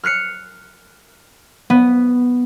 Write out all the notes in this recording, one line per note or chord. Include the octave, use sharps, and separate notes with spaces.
F6 F#6 C7 C#7
B3